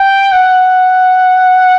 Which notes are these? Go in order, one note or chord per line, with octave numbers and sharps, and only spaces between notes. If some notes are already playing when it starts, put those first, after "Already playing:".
Already playing: G5
F#5